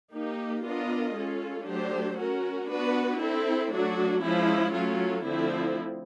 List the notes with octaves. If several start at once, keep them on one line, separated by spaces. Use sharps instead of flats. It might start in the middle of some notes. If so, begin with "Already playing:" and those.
A#3 D#4 G4
B3 D4 F4 A#4 D#5
G#3 C#4 F4 A4
F#3 A3 D4 G4 C5
C#4 F#4 A#4
B3 D4 F#4 B4
C4 E4 A4
F#3 A3 D4 F#4
F3 G#3 C#4 E4
F#3 A3 C#4 F4 A4
D3 F3 A3 C4 E4